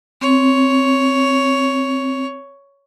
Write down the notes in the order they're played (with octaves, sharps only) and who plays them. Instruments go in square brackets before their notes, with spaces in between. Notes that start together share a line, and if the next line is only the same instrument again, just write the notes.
[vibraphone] C4 [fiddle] C#5